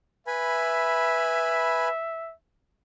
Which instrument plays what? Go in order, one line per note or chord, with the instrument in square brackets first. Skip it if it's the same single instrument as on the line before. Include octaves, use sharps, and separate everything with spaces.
[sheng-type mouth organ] B4 G#5 B5 [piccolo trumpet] E5